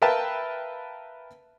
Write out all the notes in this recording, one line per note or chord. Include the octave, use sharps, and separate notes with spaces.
A#4 B4 E5 F5 G5 A5